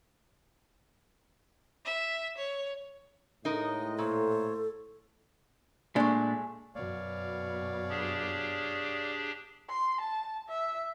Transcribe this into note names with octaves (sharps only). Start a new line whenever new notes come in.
E5
C#5
A2 G#3 D#4 A#4 D#5
A#2 A4 C5 C#5
A#2 G#3 A3 D4
F#2 B2 C#5 D5 F5
D4 G4 G#4
C6
A5
E5